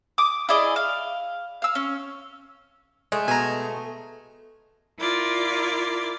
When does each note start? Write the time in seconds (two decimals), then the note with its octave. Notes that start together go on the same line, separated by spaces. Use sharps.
0.18 D6 D#6
0.49 E4 G#4 D5 D#5
0.76 F5
1.62 F5 E6
1.75 C#4
3.12 G#3 A3
3.28 B2 G#5 A#5
4.99 E4 F4 A#4 D5